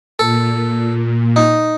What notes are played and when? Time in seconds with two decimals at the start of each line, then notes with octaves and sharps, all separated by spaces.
0.19 A#2 A4
1.36 D#4